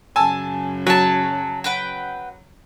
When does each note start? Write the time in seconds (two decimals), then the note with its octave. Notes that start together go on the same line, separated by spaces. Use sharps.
0.16 F#2 C#3 G#5 A5 E6
0.87 F#3 G#5 A5
1.64 B4 F#5 G5